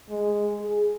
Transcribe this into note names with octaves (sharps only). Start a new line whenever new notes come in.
G#3
G#4